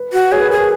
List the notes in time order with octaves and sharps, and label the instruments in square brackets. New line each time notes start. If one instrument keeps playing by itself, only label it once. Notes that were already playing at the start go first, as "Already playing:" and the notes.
Already playing: [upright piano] B4
[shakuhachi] F#4
[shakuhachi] G#4 [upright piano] C#5
[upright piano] B4
[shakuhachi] G#4 [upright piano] A#4
[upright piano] B4